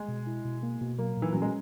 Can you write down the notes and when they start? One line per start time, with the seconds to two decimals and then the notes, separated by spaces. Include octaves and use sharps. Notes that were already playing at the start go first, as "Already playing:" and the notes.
Already playing: G#3
0.09 B2
0.27 E4
0.45 B2
0.63 A#3
0.81 B2
0.98 F#3 A#3
1.17 A#2
1.22 E3
1.32 F#3 C#4
1.42 G#3